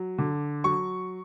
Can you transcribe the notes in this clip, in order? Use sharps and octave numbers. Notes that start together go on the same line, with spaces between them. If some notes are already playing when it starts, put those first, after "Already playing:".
Already playing: F#3
D3
F#3 C#6